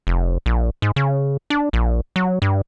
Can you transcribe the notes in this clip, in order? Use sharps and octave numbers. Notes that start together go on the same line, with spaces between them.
F1
A#1
G#2
C#3
D4
A#1
F#3
G2